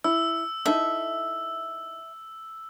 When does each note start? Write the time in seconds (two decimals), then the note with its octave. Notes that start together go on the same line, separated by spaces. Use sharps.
0.04 E4 E6
0.66 D#4 E4 A4 E5